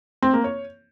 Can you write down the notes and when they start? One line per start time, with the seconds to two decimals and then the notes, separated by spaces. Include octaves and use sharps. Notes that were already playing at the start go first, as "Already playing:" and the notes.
0.22 C4
0.33 A#3
0.44 C#5